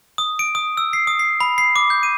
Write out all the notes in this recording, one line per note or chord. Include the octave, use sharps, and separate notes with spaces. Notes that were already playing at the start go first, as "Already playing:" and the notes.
D#6
D7
D#6
E6
C7
D#6
C7
B5
C7
D6
G6
D#7